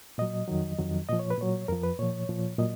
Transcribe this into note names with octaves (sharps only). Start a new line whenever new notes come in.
A#2 F#3 D#5
F2 D#3 F#3
F2 D#3 F#3
A#2 F3 D#5
C#5
B4
A#2 F#3 C#5
F2 F3 A#4
B4
A#2 F3 C#5
A#2 F3
A#2 F#3 D#5